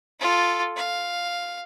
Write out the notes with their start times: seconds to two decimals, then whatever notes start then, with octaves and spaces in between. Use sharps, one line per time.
0.20 F4 A4
0.76 F5